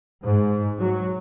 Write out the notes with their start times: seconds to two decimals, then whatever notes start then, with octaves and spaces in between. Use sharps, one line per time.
0.22 G#2
0.78 F#3